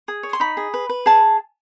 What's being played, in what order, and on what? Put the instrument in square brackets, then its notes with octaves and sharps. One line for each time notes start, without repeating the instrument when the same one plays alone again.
[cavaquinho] G#4
C#5
C6
D#4 B5
G#4
B4
B4
G#4 A5